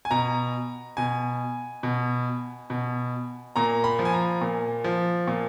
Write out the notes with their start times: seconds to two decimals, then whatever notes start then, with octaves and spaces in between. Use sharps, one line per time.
0.05 G#5
0.11 B2 A#5
0.97 B2 G#5
1.83 B2
2.70 B2
3.56 A#2 A#5
3.84 B5
3.99 F3
4.05 G#5
4.13 A#5
4.41 A#2
4.84 F3
5.27 A#2